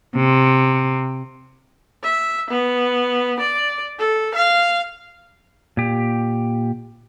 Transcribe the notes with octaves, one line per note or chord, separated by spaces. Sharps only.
C3
E5
B3
D5
A4
F5
A#2 G4